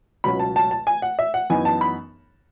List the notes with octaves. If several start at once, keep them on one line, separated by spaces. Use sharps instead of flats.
C#2 B2 F#3 C#4 B5
A5
A5
A5
G#5
F#5
E5
F#5
F#2 E3 B3 D#4 G#5
A5
B5